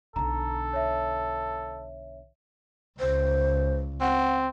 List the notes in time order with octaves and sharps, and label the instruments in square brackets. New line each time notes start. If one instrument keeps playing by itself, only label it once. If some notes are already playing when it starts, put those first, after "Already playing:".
[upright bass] B1 D3 [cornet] A4 [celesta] A#5
[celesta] C#5 E5
[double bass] C#2 [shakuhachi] C5
[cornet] C4 [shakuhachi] F#5